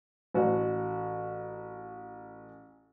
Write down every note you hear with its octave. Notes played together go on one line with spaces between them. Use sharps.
A1 F#4